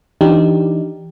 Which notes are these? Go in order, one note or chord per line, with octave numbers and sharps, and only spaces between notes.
E3 D4 D#4 G4